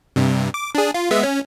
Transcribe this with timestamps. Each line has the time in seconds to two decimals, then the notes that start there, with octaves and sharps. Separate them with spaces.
0.16 G2 C3
0.54 D6
0.75 D4 G#4
0.94 F4
1.11 G#3 B3 E5
1.23 C#4